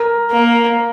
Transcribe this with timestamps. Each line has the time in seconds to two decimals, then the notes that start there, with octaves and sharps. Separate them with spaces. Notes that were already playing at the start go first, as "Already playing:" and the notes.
Already playing: A#4
0.31 A#3